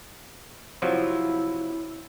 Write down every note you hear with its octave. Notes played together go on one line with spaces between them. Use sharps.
C3 F3 F#3 E4